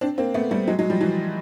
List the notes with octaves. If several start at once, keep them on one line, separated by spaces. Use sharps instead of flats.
C4 D4
A#3 C4
A3 B3
G3 A3
F#3 G#3
F#3 G#3
F3 G3
E3 F#3